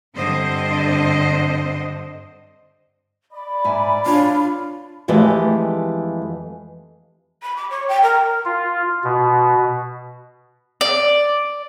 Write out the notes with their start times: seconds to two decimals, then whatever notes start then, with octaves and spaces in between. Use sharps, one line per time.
0.15 G2 D3 C4 C5 D#5
3.32 D5 B5
3.64 G#2 E5 G#5
4.06 D4 F4 C#5
5.08 F2 E3 G#3 A3 G4 D#5
7.43 B5
7.56 D6
7.70 C#5
7.88 G5
8.02 A#4
8.45 F4
9.04 B2
10.81 D5